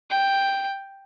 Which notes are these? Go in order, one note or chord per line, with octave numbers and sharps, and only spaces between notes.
G5